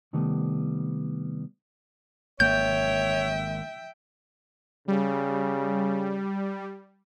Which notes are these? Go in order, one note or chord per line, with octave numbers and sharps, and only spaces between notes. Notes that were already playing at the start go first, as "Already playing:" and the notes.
C3 D#3 G3 A3 B3
G#1 A#3 C#5 E5 G5 G6
C#3 G3